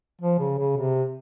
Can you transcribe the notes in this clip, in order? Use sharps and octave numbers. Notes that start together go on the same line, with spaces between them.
F3
C#3
C#3
C3